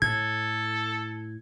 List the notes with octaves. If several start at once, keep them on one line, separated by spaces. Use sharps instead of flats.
A2 A4 G#6